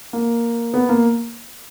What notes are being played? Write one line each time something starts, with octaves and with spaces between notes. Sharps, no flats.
A#3
B3
A#3